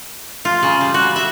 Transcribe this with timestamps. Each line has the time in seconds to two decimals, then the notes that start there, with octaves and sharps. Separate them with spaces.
0.45 F4
0.63 C#3
0.81 G3
0.94 F#4
1.16 E5